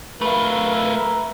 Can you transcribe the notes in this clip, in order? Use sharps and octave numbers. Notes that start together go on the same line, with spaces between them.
A3 F4 A#4 B4 E5